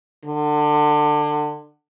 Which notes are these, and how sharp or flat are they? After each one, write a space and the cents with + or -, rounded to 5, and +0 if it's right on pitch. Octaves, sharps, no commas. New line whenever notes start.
D3 +25